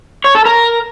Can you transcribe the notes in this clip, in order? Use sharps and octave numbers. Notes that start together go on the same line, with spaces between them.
C#5
A4
A#4